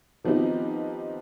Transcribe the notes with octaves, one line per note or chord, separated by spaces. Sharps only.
D#3 F3 B3 C4 D#4 G4